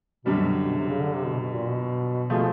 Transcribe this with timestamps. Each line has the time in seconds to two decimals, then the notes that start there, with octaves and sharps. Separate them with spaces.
0.25 F#2 B2 D3 G3
0.38 B2
0.63 B2
0.77 C3
0.89 C#3
1.01 D3
1.14 C3
1.27 B2
1.40 B2
1.53 A#2
1.66 B2
2.29 B2 F3 A3 C4 F4 G#4